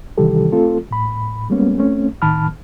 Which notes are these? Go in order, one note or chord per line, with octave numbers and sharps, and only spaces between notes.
C3 D#3 E3 G3 G4 A4
A3 C4 F4 A4
A2 B5
G3 G#3 A#3 B3 C#4
A3 C4 C#4
A2 D#3 A5 B5 F6